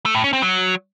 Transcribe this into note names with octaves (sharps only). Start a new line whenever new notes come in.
A3
A2
C#4
C4
F#3